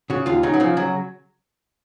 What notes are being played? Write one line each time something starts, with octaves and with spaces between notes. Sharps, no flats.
C#3 F#4
D#2 F4
C#3 D#4
F#3
C#3 F3
F#3